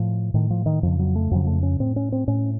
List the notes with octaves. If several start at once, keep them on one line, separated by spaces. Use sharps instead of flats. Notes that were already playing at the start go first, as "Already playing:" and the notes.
Already playing: A2 F3
A2 D#3
F3
D#3
F2 C#3 F3
F#3
A3
F2 C#3 F#3
A3
C#4
A2 C4
C#4
C4
A2 C#4